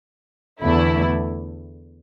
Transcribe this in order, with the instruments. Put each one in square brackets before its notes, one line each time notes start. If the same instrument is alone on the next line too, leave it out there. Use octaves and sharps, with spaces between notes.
[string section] E2 D3 A3 E4